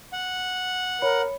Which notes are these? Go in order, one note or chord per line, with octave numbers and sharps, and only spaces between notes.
F#5
A#4 C#5 B5 C#7